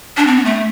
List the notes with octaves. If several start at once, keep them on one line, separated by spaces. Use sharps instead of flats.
D4
C4
B3
A3